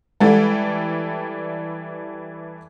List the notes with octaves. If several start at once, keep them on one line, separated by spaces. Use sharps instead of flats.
E3 G3 G#3 A4